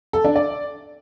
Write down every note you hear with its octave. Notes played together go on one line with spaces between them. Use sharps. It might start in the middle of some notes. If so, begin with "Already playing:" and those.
A4
D4
D5